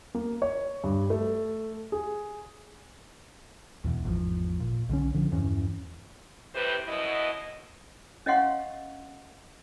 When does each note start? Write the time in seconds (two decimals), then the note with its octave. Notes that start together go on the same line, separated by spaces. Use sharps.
0.15 A#3
0.42 C#5
0.84 G2
1.10 A3
1.92 G#4
3.84 E2 B2 E3
4.05 G#1 E2 C#3 F3
4.60 A#2
4.89 B1 D3 D#3 C#4
5.14 D3 F3
5.31 E2 G2 E3 C#4
6.55 A2 C3 G3 B4 C5
6.88 F#2 B2 E4 D#5
8.26 C#4 D#5 F5 F#5 C6 C#6